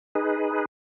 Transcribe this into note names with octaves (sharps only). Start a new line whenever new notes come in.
D#4 G#4 B4